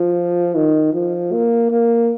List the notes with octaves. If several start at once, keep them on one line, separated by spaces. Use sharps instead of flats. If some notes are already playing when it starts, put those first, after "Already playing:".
Already playing: F3
D#3
F3
A#3
A#3